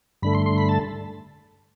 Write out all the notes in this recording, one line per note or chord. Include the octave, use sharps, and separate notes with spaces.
G2 D3 A3 B5
C6
C6
B5
A5